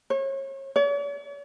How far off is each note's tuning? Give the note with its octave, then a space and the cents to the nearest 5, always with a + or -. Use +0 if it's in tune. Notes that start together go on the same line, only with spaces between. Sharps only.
C#5 -35
C#5 +45